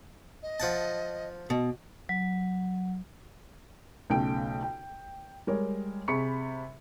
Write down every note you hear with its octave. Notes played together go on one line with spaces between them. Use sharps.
D#5
F3 F#5 A5
B2
F#3
B1 C#3 A3 G5 D7
G5
G3 G#3 A#4 C#5
C3 G#4 B5 C#6 C#7